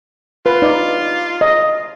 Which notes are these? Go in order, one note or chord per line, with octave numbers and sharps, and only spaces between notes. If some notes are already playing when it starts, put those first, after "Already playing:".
F4 B4
D#4 D5
D#5